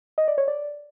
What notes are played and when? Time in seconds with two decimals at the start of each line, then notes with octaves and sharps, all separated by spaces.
0.18 D#5
0.28 D5
0.38 C#5
0.48 D5